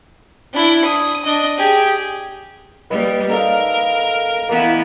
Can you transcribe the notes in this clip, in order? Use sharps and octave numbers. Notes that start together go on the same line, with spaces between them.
D4 E4
D#6
D4 D#5
G4 G#4
G3 A#3 B4 D#5
D#4 A4 A#4 F5
E3 A#3 B3 E4